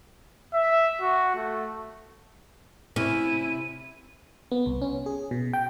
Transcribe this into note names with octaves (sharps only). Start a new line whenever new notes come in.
E5
F#4
A3
C3 C#4 E4 D#7
B3
C2
C#4
G#4
B2
G5